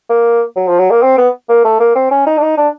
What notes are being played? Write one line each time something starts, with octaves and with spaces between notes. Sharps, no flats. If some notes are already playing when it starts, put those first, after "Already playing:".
A#3
F#3
F3
F#3
A#3
C4
B3
A#3
A3
A#3
C4
C#4
D#4
D4
D#4
D4